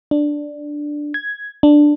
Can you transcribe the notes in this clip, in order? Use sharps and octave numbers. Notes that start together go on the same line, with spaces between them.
D4
G#6
D4